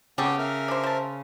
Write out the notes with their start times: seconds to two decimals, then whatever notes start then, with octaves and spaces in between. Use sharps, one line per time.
0.18 C#3 B3 C#4 G4 A4 G5 C#6
0.39 A#4 E5
0.68 D4 C5
0.84 C5 A5